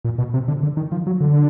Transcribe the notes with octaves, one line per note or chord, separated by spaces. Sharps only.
A#2
B2
C3
D3
D3
D#3
F3
F#3
D3